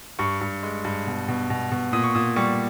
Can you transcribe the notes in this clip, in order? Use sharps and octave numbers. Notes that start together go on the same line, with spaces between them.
G2 C#6
G2
G#3
G2
B2
B2
B2
B2
A#2 D#6
C#6
A#2 D#6
G3 C#6